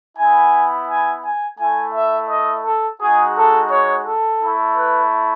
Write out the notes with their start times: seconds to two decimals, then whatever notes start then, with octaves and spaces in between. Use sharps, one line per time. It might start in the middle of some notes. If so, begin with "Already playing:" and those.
0.18 B3 E4 G#5
0.88 G#5
1.24 G#5
1.59 A3 E4 G#5
1.94 E5
2.30 D#5
2.65 A4
3.01 G#3 D#4 F#4 G#4
3.36 A4
3.71 C#5
4.07 A4
4.42 A3 E4
4.77 B4